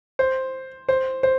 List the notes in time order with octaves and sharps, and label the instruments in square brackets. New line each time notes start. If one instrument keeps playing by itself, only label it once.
[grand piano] C5
C5
C5